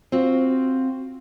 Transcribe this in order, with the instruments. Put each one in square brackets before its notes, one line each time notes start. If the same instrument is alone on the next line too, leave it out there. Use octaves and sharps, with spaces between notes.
[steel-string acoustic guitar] C4 F4 F#4